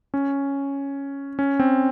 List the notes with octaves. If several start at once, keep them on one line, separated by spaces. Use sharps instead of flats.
C#4
C#4
C4